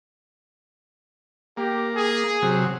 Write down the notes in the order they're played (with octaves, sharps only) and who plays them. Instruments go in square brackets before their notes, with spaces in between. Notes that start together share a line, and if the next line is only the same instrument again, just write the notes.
[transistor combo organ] A#3 [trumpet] G4
[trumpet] G#4
[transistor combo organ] C3 F#3